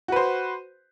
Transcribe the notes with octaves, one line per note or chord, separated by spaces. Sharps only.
F#4 B4 C5